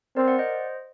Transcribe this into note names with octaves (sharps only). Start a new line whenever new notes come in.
C4 A#4 D5
D5 F#5
C5 D#5